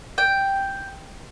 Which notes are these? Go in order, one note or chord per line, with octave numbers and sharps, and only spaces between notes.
G5